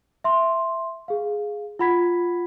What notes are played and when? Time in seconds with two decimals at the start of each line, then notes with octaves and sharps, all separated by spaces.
0.24 E5 C6
1.08 G#4 F5
1.79 F4 F#5 B5 G#6 B6